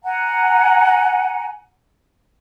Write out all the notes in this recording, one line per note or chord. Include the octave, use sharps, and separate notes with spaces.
F#5 G#5 A#5